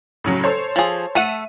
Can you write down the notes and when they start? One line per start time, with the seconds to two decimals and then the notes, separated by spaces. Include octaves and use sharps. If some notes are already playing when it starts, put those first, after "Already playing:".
0.24 A2 C#3 F#3
0.44 A4 C5 C#5
0.76 F3 G#4
1.15 A3 A4 E5 F#5 D#7